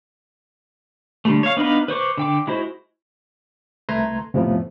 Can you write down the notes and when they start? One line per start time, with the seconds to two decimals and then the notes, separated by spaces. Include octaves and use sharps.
1.25 D3 G3 A3
1.43 C#5 F5
1.57 B3 D4 D#4 B4 F5
1.88 B4 C5 C#6 D6
2.18 D3 G5 D6
2.47 G#3 E4 F#4 C5
3.89 C2 A3 B4 A#5 C6 G#6
4.34 F2 A2 C3 F3 A3 B3